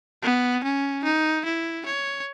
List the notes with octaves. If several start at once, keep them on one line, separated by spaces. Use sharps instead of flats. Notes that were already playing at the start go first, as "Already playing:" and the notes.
B3
C#4
D#4
E4
C#5